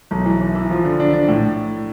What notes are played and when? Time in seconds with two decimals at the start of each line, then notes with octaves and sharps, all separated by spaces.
0.11 B1
0.26 E3
0.40 E3
0.55 E3
0.70 F3
0.85 D3
1.00 D4
1.13 D4
1.28 A2